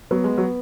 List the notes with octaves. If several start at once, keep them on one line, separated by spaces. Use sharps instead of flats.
F#3 B3
G#3
F#3